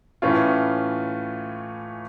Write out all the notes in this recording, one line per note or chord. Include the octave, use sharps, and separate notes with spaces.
A2 E3 A3 C#4 F4